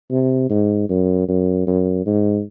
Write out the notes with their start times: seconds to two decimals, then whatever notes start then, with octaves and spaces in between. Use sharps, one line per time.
0.10 C3
0.49 G#2
0.89 F#2
1.28 F#2
1.67 F#2
2.06 G#2